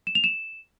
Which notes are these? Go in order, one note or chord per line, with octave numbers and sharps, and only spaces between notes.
E7
F7
E7